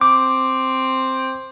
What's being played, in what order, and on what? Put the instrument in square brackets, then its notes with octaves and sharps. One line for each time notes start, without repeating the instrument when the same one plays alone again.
[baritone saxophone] C4 [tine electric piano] D6